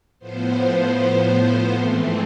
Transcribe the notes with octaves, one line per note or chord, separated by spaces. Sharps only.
A2 F3 B3 C5
C5
G#2 E3 A3 C4